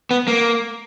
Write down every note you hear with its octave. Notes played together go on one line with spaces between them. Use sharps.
B3
A#3